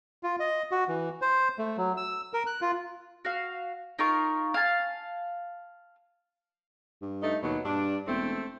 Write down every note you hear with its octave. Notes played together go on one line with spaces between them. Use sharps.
F4
D#5
F#4
E3
C5
A3
F#3
E6
A#4
F#6
F4
F#4 F5
D#4 F4 A#4 C#6
F5 G#5 A5
G2
A3 D#4
D#2 B2 F#3
G2 D4
E1 A3 C4